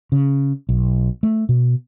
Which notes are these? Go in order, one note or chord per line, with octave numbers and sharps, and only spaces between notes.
C#3
B1
A3
B2